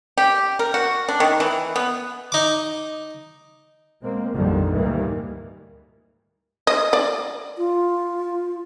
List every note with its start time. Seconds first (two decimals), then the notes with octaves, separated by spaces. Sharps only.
0.18 G4
0.59 A#4
0.74 F#4
1.09 D4
1.20 D#3
1.40 E3
1.76 B3
2.32 D#4 D6
4.01 B2 G#3 A#3 C4
4.32 A#1 F2 B2 D3 D#3 G3
4.73 D2 G#2 D#3 E3 G3 A#3
6.67 D#5
6.93 D5
7.58 F4